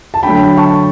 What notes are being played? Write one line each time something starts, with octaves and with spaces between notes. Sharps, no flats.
A5
D3 F#3 A3 G5 B5
A5 C#6